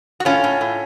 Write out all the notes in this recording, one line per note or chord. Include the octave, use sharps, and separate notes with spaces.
F#4
A2 C#4 F4
A2
A2